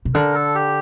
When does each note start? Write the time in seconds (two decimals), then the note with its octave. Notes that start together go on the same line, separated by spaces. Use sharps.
0.05 C3
0.14 D3 A#4
0.35 A4
0.55 G4